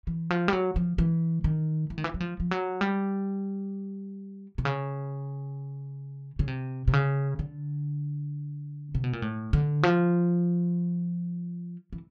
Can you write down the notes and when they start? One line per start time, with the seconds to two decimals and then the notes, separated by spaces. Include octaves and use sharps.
0.07 E3
0.30 F3
0.48 G3
0.53 F#3
0.76 F3
0.98 E3
1.44 D#3
1.90 E3
1.98 D#3
2.04 E3
2.14 F#3
2.20 F3
2.40 F3
2.51 F#3
2.81 G3
4.58 C3
4.65 C#3
6.39 C#3
6.48 C3
6.88 C3
6.93 C#3
7.39 D3
8.95 C3
9.04 B2
9.13 A#2
9.22 A2
9.53 D3
9.83 F3
11.93 E3